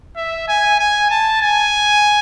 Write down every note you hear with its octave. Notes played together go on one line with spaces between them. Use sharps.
E5
G#5
G#5
A5
G#5